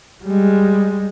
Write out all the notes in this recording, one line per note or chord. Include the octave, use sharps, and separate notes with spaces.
G3 G#3